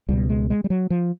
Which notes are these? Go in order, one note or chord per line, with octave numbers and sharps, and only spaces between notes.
C#2 B2 G3
G#3
G#3
G3
F#3
F3